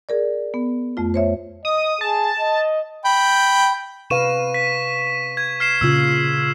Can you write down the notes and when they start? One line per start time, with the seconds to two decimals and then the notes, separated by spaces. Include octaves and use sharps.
0.09 G#4 A#4 D5
0.54 B3
0.97 F2 A3 F4
1.14 C5 C#5 E5
1.65 D#5 D#6
2.01 G#4 A5
2.40 D#5
3.05 G5 B5
4.10 C3 B4 F5 C#6 D#7 E7
4.54 B6
5.37 G#6
5.60 F6 C7 E7
5.81 A#2 C#3 F4 E6